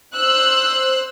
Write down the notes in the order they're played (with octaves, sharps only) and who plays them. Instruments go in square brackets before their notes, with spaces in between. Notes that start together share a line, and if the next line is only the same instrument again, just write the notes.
[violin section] C5 E6 F#6